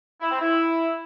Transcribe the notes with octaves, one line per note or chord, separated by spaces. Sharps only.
E4
C4
E4